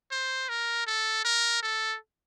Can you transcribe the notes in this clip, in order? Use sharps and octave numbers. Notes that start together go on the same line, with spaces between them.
C5
A#4
A4
A#4
A4